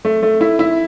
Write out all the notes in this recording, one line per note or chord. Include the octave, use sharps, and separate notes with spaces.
A3
A3
E4
E4